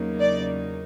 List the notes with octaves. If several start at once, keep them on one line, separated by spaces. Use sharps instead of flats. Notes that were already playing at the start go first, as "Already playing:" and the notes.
Already playing: E2 C#3 F#3 A#3 D#4
D5